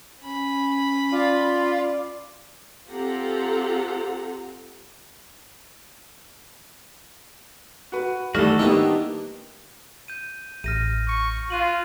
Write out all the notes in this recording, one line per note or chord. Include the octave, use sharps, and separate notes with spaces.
C#4 B5
F4 D5
C4 F4 G4 A4 F#5 A#5
F#4 B4
D#3 E3 G3 A3 D#4 F#4 A4 F6
D#3 G3 A#3 B3 D4 E4 D#5
G6 D#7
A1 F6 A#6 D#7
C#6
F4 F#6 D#7 F#7